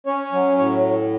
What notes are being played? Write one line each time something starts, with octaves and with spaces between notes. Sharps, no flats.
C#4 C#5
F#3
A2 C#5